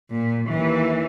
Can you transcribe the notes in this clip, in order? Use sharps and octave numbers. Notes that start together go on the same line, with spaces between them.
A#2
D#2 E3